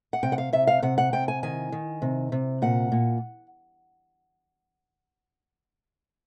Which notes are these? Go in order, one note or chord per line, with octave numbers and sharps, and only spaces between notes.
F#5
C3 G5
F#5
F5
C3 E5
F5
C3 F#5
F#5
C3 G5
G#5
D#3 G#5
D#3
C3
C3
A#2 F#5
A#2